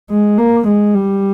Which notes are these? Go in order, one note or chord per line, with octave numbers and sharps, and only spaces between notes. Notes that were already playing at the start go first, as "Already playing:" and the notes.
G#3
A#3
G#3
G3